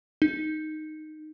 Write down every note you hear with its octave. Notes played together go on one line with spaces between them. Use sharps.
D#4